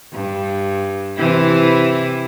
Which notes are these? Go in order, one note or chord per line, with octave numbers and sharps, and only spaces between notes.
G2
C3 E3 E4